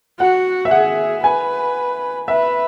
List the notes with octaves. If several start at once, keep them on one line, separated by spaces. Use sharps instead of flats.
F#4 F#5
E5
G#4 F#5
B4 G#5
B4 E5